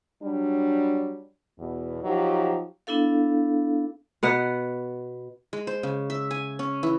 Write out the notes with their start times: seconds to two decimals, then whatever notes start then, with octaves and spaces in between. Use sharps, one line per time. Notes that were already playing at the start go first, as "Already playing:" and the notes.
0.23 F#3 G3 D4
1.59 E2 B2
2.04 F3 F#3 D#4 G4
2.87 B3 D4 E4 A4 F5
4.23 B2 B3 F#5
5.53 G#3
5.67 C5
5.83 C#3
6.10 E5
6.31 G#5
6.59 C#4
6.83 E3